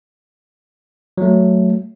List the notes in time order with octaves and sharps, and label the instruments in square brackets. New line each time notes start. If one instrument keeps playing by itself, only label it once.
[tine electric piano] F#3 A3